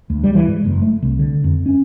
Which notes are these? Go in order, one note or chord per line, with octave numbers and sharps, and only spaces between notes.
D2
G3
E3
G#2
F#1
A3
C2
D3
F2
C#4